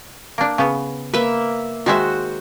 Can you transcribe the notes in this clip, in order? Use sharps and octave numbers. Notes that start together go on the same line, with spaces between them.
A#3 D4
C#3 B3
A#3 B4 E5
D#3 G#3 F#4 C5 E5